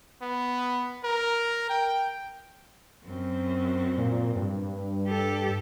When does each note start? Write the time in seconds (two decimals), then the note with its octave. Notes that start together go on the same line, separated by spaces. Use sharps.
0.22 B3
1.03 A#4
1.69 G5
3.05 F#2 C4
3.98 A#2
4.36 G2
5.07 G4 A4